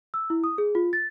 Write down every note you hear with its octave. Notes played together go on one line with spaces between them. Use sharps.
E6
E4
D#6
G#4
F4
A6